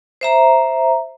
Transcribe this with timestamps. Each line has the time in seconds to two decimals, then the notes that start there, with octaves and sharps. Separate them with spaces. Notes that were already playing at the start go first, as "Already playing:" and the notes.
0.21 C5 E5 A#5